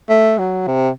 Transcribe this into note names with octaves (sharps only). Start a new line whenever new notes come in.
A3
F#3
C3